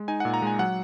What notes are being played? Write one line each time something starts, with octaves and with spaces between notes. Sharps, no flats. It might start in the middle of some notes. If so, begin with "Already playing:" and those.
Already playing: G#3
D#4 G#5
A#2 F#5
A#5
G#3 G#5
F#3 F#5